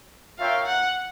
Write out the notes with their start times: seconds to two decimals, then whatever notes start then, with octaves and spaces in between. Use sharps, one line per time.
0.38 F4 A#4 C#5 E5 F5 G5
0.66 F#5